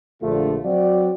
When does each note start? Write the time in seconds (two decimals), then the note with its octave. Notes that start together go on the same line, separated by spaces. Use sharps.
0.22 A#1 D3 A3 F4
0.64 F#3 C4 F#4 D5